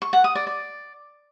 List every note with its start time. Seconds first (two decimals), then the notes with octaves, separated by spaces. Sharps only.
0.02 C#6
0.13 F#5
0.24 D#6
0.35 D5
0.47 D5